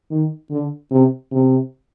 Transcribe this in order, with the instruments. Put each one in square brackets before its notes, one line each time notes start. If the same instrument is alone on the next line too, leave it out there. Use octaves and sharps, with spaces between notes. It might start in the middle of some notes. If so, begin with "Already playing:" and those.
[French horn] D#3
D3
C3
C3